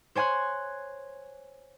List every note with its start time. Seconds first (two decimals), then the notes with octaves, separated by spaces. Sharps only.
0.15 C5 C#5 G#5 C6 F#6